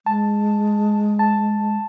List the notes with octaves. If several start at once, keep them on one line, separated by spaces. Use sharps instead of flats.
G#3 A5
A5